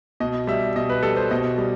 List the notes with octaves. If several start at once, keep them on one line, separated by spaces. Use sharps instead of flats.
B2 D#5
G3 E5
B2 D#5
B4
G3 A4
C5
B2 D#5
G3